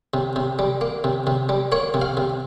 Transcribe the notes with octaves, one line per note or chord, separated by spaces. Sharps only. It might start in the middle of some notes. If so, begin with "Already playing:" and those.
C3
C3
G3
A#3
C3
C3
G3
A#3 C#5
C3
F5
C3